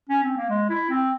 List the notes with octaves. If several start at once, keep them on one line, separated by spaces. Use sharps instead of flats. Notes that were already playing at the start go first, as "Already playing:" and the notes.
C#4
C4
A#3
G#3
E4
C4